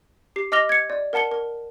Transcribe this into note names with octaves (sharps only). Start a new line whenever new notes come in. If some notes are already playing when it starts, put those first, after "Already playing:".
G4 C7
D#5 D6 F6 A#6 F7 G7
G#6 C#7
D5
A#4 F#5 A5 C#7 G7
A#4